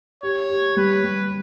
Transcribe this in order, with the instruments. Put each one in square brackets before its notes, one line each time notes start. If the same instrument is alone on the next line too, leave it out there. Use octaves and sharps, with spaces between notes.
[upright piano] G4 [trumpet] C#5
[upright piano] G4
[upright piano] G3 [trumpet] B4
[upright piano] G3